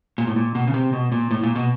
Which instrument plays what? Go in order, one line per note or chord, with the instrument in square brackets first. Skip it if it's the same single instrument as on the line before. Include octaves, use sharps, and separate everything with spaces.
[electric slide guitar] A#2
A2
A#2
B2
C#3
C3
B2
A#2
A2
A#2
B2